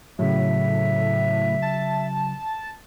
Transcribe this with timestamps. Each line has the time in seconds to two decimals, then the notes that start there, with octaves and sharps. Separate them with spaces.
0.19 A2 C#3 F#3 E5
1.62 A5